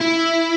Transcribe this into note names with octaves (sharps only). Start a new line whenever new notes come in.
E4